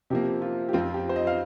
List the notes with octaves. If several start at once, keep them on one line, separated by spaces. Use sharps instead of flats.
C3 F3 A#3 G4
F4
G4
F2 F3 C4 F4
G4
C5
D#5
F5